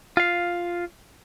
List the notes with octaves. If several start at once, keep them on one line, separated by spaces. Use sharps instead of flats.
F4 F5